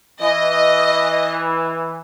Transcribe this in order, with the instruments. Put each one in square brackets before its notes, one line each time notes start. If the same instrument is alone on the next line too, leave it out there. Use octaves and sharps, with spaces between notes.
[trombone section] E3 [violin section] D#5